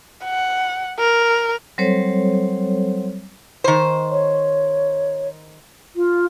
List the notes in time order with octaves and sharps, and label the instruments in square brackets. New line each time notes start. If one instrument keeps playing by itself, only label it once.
[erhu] F#5
A#4
[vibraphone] F#3 G3 C4 A4 C5 C#5
[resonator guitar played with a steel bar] D#3 C5
[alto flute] C#5
F4